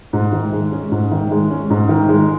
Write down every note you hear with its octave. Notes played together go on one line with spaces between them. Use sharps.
G#2
D#3
G#3
C#4
G#2
D#3
G#3
C#4
G#2
D#3
G#3